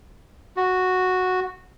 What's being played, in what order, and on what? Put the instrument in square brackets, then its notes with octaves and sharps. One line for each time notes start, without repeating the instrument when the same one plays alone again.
[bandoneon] F#4